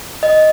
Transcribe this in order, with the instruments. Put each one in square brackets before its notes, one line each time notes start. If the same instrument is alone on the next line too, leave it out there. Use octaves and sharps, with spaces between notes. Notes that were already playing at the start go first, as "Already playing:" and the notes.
[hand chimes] D#5